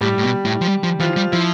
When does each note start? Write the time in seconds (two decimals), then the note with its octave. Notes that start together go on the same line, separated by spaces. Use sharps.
0.01 A2 G3 G4
0.18 A2
0.23 B2
0.45 A2
0.61 F3
0.67 G3
0.84 F3
1.00 E3 F3 F4
1.16 G3
1.32 F3 E4